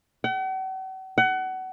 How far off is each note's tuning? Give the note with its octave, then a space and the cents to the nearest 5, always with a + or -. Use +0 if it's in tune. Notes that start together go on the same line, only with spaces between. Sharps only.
F#5 +45
F#5 +25